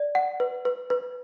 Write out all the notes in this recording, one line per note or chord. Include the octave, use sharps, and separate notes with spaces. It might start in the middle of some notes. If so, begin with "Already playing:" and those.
Already playing: D5
F#5
B4
B4
B4